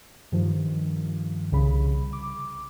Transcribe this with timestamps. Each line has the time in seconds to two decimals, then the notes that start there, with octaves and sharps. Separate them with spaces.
0.32 G2 D#3 F3
1.52 C2 C#3 B5
2.13 D6